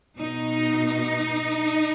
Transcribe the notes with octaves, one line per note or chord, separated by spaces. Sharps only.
B2 D#4